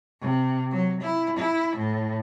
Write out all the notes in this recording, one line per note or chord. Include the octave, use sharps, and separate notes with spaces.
C3
F#3
E4
E4
A2